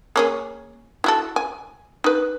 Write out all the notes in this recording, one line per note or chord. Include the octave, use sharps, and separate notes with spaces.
A#3 C#4 G#4
E4 F#4 A4
G#5
D#4 B4